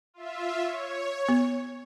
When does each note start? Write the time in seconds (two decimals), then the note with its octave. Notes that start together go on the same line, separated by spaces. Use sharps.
0.14 F4 E5
0.63 C#5
1.29 B3